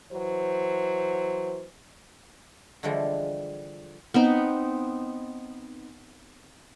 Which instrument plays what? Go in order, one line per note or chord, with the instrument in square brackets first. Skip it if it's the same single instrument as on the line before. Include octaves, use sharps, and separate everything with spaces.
[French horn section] E3 F#3 C5
[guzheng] D3 E3 F3 G3 G#3
[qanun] B3 C4 D#4